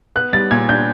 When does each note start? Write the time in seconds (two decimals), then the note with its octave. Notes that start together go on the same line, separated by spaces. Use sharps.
0.16 B3 F#6
0.33 G3 A6
0.51 A#2 G#6
0.69 D4 G6